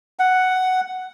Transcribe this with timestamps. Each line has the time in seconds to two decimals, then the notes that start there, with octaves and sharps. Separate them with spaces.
0.19 F#5